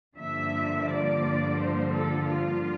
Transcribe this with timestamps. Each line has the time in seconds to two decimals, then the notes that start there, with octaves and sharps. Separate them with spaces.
0.18 G2 D3 F3 A#3 E5
0.88 D5
1.57 C5
1.93 A4
2.27 F4